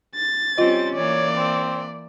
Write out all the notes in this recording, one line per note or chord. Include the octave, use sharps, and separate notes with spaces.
A6
G3 C4 C#4 F4 C5 D#5
E3 A#3 C#5 D5
C4